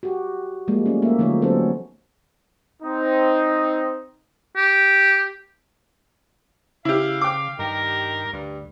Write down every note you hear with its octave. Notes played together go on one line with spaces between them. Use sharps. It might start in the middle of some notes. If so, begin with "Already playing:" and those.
F#4 G4
F3 G3 G#3 A#3
A3 C#4
A#3 E5
D3 F3 F#3 A3 D#4 C#5
F#3 B3 C#4 A4 C5
C4 D#4
G4
C#3 E4 G4 F5
G5 D6
G2 D#3 G4 A#4
D2 G2